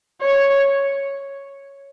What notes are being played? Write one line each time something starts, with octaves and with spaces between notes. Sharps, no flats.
C#5